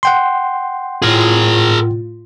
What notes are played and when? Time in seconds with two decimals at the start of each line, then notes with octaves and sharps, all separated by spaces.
0.03 F#5 G5 C6
1.02 A2 F4 G#4 A#4